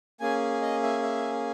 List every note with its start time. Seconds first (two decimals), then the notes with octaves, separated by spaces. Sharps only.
0.20 A#3 C#4 G#4 G#5
0.62 D#5
0.83 E5
1.03 E5